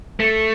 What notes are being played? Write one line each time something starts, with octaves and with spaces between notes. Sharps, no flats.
A3